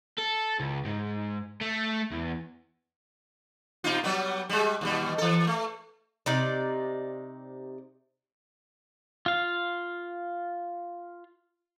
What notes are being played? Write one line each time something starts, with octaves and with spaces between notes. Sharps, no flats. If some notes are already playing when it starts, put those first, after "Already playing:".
A4
C#2
G#2
A3
E2
B2 D#4 F4
F#3 G3 B3
G3 G#3
D#2 B2 G3
E3 A4
A3
C3 D#4 D5
F4 F5